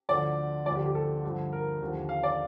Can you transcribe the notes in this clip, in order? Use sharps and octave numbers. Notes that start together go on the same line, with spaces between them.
D2 D3 F3 D5
D2 D3 F3 D5
G4
G4
A4
G2 D3 F3
A#4
D#2 D3 F3
F5
D5